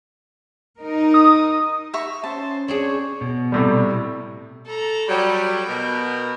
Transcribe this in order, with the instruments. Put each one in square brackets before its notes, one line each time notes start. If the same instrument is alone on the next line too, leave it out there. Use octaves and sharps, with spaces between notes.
[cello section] D#4 A#4
[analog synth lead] D#6
[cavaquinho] E5 A#5 C#6
[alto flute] C#4 [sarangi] C5 [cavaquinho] A5
[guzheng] C4 D4 G#4 [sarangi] C#5
[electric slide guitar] B2
[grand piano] A2 C3 G3
[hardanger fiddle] A4 A#5
[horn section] F#3 G3 [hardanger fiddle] G5 B5
[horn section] B2 A#4